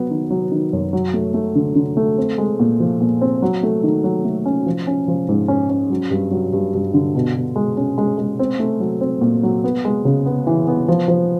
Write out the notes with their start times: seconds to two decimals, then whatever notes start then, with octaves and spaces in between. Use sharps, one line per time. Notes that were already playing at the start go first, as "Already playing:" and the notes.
Already playing: F#3 B3
0.11 D#3
0.30 F#3
0.51 D#3
0.73 F#2
0.93 F#3
1.14 A3
1.34 A3
1.55 D3
1.75 D3
1.97 A3
2.18 C4
2.38 G#3
2.59 A#2
2.80 F3
3.01 A#2
3.21 C4
3.42 F#3
3.63 A3
3.83 D#3
4.04 F#3
4.25 A3
4.46 C#4
4.66 F3
4.87 C#4
5.08 F3
5.29 G#2
5.48 C#4
5.70 C#4
5.90 F#3
6.11 G2
6.31 F#3
6.53 G2
6.74 G2
6.94 D3
7.15 B2
7.36 B2
7.56 G#3
7.77 C#4
7.98 G#3
8.18 G#3
8.39 C4
8.59 A3
8.80 F#3
9.01 C4
9.21 A#2
9.43 F#3
9.64 B3
9.85 G#3
10.05 C#3
10.26 B3
10.47 E3
10.67 B3
10.88 F3
11.08 F3